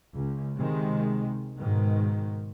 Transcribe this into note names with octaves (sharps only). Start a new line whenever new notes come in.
C#2
C3 D#3 G#3
G#2 B2 D#3